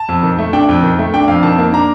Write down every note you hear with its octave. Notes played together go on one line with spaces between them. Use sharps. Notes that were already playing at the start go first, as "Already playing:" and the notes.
Already playing: A5
F2
D#3
A3
D4 G5
F2
D#3
A3
D4 G5
F2 F5
D#3 A5
A#3
D4 A#5